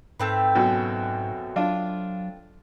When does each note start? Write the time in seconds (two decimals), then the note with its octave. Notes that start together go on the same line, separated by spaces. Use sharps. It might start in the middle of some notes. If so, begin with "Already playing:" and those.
0.20 G#2 A3 C4 B4
0.55 F#2 B2
1.56 F#3 D4 F4